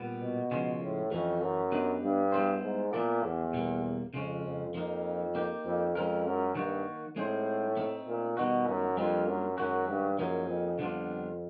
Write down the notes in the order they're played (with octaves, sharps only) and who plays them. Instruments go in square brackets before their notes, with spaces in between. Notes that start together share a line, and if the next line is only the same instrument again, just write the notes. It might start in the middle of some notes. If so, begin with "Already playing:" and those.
Already playing: [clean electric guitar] A#2 G3 B3
[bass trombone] B2
[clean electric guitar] C#3 F3 G#3 C#4 F4
[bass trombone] A2
[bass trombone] F2 [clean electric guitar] E3 A3 C#4
[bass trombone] F#2
[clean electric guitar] B3 D4 G4 B4 D#5
[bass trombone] G2
[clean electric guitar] G3 B3 E4 G#4 C5
[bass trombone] G#2
[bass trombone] A#2 [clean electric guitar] F#3 B3 E4 A4 D5
[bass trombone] E2
[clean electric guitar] B2 G3 A#3
[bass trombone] F2 [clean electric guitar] C#3 F3 G#3 C#4
[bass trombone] F2
[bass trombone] F2 [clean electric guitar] F3 A#3 D#4
[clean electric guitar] A#3 D#4 G4
[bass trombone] F2
[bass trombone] F2 [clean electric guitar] G#3 C#4 F4 A#4
[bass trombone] F#2
[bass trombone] G2 [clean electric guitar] D#3 F#3 A#3 D#4 F#4
[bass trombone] A2 [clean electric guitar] G#3 C4 D#4 G#4 C5
[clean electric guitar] A3 C4 D#4
[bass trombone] A#2
[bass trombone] B2 [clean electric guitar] D#3 G3 B3 D#4 F#4
[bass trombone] F#2
[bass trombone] F2 [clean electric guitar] G3 A#3 D4 F4
[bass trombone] F#2
[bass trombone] F#2 [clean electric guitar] D#3 G#3 C#4 F#4
[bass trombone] G2
[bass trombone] F#2 [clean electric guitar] F3 A#3 D#4 G#4
[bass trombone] F2
[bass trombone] F2 [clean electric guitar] D3 G3 B3 D4 F4